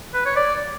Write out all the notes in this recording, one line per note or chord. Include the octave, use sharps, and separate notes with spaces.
B4
C#5
D5